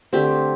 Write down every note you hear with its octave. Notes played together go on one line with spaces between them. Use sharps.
D3 A3 C4 G4